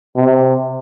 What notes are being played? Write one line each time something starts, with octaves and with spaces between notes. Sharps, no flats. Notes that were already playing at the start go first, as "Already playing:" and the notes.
C3